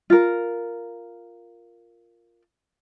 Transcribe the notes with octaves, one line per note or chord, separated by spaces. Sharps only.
F4 A#4